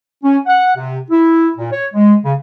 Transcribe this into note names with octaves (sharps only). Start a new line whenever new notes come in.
C#4
F#5
C3
E4
A#2
C#5
G#3
C#3